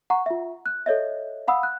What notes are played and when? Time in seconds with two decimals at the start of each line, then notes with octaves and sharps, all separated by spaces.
0.10 F#5 A#5 C#6
0.26 F4 E5
0.66 F#6
0.86 A4 C#5 D#5 E5
1.48 F5 F#5 B5 D#6 E6
1.63 F#6